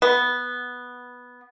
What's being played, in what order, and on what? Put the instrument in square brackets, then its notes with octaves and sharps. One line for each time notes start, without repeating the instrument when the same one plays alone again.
[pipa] B3